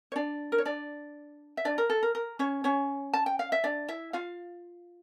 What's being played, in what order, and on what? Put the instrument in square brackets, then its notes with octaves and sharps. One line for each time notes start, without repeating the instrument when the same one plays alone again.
[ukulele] C#5
D4 D5
A#4
C#5
D4 D5
E5
D4 D5
A#4
A4
A#4
A#4
C#4 C#5
C#4 C#5
A5
G5
F5
E5
D4 D5
E4 E5
F4 F5